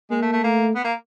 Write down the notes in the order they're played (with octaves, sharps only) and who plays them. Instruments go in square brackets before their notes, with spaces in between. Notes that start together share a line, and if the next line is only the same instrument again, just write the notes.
[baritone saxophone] G#3 [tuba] A#3
[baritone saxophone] A3
A3
[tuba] A3 [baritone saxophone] A#3
[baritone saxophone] B3
A#3